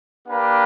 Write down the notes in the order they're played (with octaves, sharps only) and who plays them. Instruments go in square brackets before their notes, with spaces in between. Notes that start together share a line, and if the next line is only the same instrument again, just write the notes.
[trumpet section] A#3 D4 G4 B4